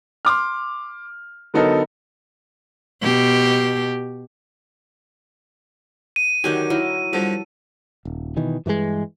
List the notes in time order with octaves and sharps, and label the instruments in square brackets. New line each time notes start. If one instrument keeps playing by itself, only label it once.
[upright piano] C6 D6 F6
D3 F#3 B3 D#4 A4 A#4
[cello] B2 G4
[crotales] D#7
[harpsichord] D3 G#5 [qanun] D#3 F#3 G4
[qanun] F#3 E4 A#4
[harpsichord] G2 D3 F3 [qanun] A4
[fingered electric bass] D#1
B2 D#3 E3
G2 E3 F3 G#3